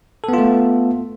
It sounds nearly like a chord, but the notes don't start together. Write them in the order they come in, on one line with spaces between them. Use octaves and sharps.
A4 B3 F4 A3